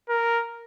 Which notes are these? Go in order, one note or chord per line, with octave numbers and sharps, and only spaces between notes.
A#4